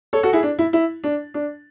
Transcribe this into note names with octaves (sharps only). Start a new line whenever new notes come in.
A4 C#5
F#4 A4
E4 G#4
D4
E4
E4
D4
D4